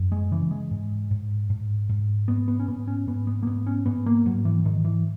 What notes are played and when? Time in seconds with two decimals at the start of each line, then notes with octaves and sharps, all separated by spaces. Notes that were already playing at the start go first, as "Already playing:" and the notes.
Already playing: F#2
0.12 G#3
0.31 C#3 E3
0.51 G#3
0.71 G#2
1.11 G#2
1.50 G#2
1.89 G#2
2.28 G#2 B3
2.48 B3
2.60 C#4
2.68 G#2 B3
2.87 C#4
3.07 G#2 B3
3.27 B3
3.43 A#3
3.47 G#2 B3
3.67 C#4
3.86 G#2 B3
4.06 A#3
4.26 G#2 F#3
4.45 E3
4.65 G#2 D#3
4.85 E3